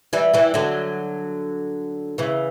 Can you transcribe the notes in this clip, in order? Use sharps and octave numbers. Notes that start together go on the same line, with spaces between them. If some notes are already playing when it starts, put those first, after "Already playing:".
E3 G3
E3 G3
D3 F#3
C#3 E3